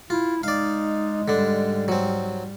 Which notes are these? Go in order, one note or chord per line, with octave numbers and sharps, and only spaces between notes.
E4 F4
G#3 D#4 D5 F5
G#2 D3 G3 D4
F#3 C4